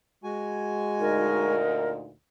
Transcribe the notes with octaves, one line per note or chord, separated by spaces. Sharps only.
G#3 F#4 G#5
D2 A#2 D#4 A#4